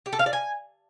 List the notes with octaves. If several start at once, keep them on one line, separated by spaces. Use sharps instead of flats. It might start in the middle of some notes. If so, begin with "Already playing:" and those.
G4
A4
F5
D5
G#5